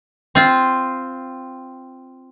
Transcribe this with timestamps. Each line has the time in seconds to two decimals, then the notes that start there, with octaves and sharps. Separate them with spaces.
0.35 C4 F4